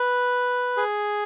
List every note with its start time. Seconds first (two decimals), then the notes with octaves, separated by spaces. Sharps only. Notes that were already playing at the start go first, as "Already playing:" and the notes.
Already playing: B4
0.77 G#4